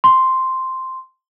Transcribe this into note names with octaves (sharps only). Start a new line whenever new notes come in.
C6